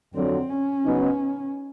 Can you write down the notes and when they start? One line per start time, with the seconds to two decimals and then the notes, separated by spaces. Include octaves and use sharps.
0.14 F2 D3 F#3 C4
0.49 C#4
0.85 C#3 F#3 B3 D#4